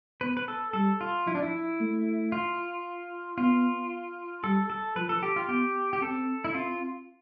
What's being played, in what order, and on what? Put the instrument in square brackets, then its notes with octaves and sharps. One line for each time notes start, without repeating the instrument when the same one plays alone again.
[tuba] B3 [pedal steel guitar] B4
[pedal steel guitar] B4
A4
[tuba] G3 [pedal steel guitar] A4
[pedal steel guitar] F4
[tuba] F3 [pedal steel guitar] E4
[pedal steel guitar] D4
E4
[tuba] A3
[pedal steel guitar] F4
[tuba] B3 [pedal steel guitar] F4
[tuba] G3 [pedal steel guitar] A4
[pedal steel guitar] A4
[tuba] F3 [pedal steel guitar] B4
[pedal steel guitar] A4
G4
F4
[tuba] B3 [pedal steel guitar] G4
[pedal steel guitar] G4
[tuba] C4 [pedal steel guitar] A4
[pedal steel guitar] E4
[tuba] C4 [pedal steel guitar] F4